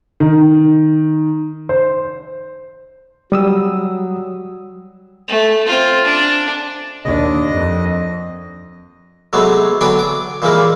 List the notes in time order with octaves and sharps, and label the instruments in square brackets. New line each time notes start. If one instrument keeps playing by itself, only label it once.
[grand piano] D#3
C5
[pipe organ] F#3 [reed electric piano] G3 D#6 E6
[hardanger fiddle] A3
C4 F4
D4
[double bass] D#2 D4 [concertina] D#5
[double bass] F2
[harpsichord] C3 F#3 G#3 A3 B3
D3 F#3 B3 D4 G5 G#5
D6
A#2 E3 F3 G3 G#3 A#3